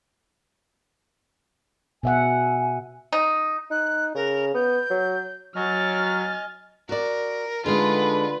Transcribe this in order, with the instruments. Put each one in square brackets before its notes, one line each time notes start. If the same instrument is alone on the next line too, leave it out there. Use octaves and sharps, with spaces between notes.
[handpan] B2 E5 F#5 [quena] G#5
[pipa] D#4
[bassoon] D#4 [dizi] F#6
[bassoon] C#3 [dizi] A#4
[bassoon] B3 [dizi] G6
[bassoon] F#3
[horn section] F#3 [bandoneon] D#5 G#5 [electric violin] F6 A6
[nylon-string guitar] F#4 D5 [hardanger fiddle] A#4
[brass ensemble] D3 [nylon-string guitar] G#3 D#4 G#4 [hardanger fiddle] F4 [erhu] B4